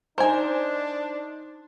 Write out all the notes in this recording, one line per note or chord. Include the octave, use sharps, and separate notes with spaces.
D4 D#4 A#4 C5 G#5